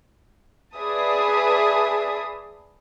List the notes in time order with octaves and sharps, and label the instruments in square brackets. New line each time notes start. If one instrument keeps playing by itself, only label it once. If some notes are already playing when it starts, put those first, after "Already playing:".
[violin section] G#4 B4 D5 E5 A5 D#6